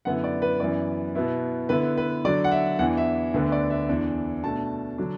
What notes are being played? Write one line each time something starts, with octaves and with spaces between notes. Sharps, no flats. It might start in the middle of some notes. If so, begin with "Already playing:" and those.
F#2 D3 B3 E4 F#5
D5
B4
F#2 E3 B3 E4 D5
B2 B3 E4
D3 B3 E4 B4
B4
D3 F#3 D4 D5
F#5
E5
E2 E3 D4 F#5
E5
D2 D3 B3 D4
D5
E5
E2 E3 D4
B2 A3 D4 A5
D3 F#3 D4